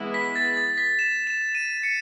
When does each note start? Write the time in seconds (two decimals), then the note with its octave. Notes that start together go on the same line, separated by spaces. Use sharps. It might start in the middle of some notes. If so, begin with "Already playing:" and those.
Already playing: E3 G#3 B3 E4
0.14 B6
0.36 A6
0.57 A6
0.78 B6
0.99 E7
1.27 E7
1.55 D#7
1.83 C#7